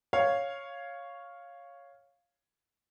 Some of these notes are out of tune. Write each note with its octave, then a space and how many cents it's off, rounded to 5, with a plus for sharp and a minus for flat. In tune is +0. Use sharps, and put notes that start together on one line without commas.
C#5 +0 F5 +0